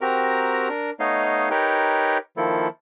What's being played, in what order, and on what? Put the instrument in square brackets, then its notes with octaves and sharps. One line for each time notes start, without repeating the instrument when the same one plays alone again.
[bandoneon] C4 F#4 G4 A#4 A#5
D4 A#4
A3 B3 D#4 C#5 D#5 F5
D#4 G4 A#4 B4 C#5 G5
D#3 F3 A#3 E4 A4